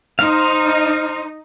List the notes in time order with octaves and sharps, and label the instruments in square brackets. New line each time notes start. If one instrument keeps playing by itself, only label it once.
[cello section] D#4 [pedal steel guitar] C5 F5